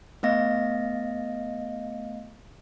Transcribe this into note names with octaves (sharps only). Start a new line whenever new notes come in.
A3 B3 D#5 F5 A#6